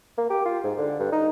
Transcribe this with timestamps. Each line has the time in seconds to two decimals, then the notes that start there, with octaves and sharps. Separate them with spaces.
0.18 A#3
0.30 G4
0.45 F4
0.64 G#2
0.78 D3
0.99 G2
1.12 D#4